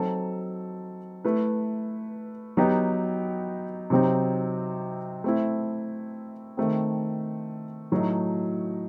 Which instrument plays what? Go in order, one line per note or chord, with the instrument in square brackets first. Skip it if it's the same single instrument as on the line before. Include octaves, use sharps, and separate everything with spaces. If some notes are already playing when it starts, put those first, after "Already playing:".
Already playing: [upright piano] F#3 C4 D#4 A4
A3 E4 B4
F#3 B3 D#4 G4
C3 F#3 C4 D#4
A3 C4 E4
D#3 A3 C4
A2 F#3 A3 D#4